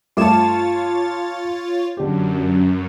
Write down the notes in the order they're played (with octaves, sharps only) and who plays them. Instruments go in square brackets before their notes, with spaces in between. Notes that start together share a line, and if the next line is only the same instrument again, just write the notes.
[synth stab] G2 A3 E7 [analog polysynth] F4 C#5 A6 [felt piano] A5 D6
[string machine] F#2 [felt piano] D3 G4